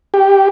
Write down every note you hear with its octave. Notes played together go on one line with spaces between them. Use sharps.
G4